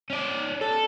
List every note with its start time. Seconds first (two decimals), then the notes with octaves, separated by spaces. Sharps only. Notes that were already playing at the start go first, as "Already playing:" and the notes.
0.10 C#4 D5
0.61 A4